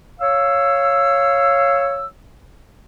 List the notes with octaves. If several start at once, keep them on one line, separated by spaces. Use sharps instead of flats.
C#5 F5 E6